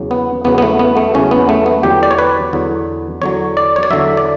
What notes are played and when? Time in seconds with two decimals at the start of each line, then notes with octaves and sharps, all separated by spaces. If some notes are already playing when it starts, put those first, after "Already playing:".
Already playing: E2 C#3 F#3
0.11 B3
0.44 E2 C#3 F#3 B3
0.58 B3
0.62 A3
0.79 B3
0.97 A3
1.14 E2 C#3 F#3 C#4
1.31 B3
1.49 A3
1.66 B3
1.83 E2 D3 F#3 G4
2.03 D5
2.11 C#5
2.19 B4
2.53 E2 D3 F#3
3.22 E2 D3 F#3 C#5
3.57 D5
3.76 C#5
3.83 D5
3.90 E2 D3 F#3 E5
4.17 D5